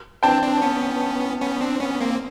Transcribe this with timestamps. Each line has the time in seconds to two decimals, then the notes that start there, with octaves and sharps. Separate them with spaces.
0.23 C4 D4 G5 A5
0.43 C4 D4
0.62 B3 C#4
1.42 B3 C#4
1.61 C4 D4
1.81 B3 C#4
2.00 A#3 C4